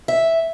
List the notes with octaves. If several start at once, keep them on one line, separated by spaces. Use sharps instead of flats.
E5